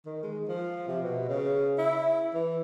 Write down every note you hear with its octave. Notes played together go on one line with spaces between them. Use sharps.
D#3
G#3
F3
C3
B2
C#3
E4
E3